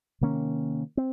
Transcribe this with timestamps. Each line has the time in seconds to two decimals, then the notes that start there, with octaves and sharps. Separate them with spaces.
0.21 C3 D#3 A#3 C#4
0.97 C4